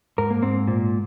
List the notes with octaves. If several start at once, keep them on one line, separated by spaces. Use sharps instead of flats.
G#2 A#4
A#3
G#2 C4
A#2